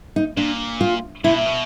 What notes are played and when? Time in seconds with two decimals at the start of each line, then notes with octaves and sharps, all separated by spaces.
0.16 D#4
0.37 A#2 D4
0.81 F4
1.24 C3 E4
1.32 B2
1.39 A#2
1.46 B2